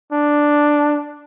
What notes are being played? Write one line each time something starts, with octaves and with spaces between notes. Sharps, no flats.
D4